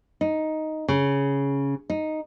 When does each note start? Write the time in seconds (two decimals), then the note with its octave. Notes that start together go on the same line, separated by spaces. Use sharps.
0.21 D#4
0.88 C#3
1.90 D#4